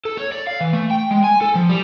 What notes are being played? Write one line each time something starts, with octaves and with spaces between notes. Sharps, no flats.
A4
C#5
D5
F5
E3
A3
G5
G#3
G#5
A4
F3
G3